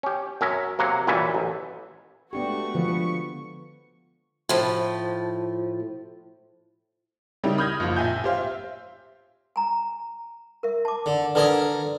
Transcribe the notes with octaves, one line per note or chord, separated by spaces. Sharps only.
C#4 G4
F#2 C#4 A#4 E5
C3 F#3 A#3 F#5
F#2 A#2 E3 G3 C#4 E5
A1
G#3 A3 B3 D4 F#4 G4 C#6
D3 F3 B4
A2 F3
C#3 G3 D#4 E4 G4 A#4
B5 D#6 F6 G6 G#6 A#6
F#1 F3 F4
A#1 E5 G#5 G6
G4 C5 F5
E5
G#5 A#5
A#4 E5
A5 D6
D3
D3 A#4 B4 D5 G#5 D#6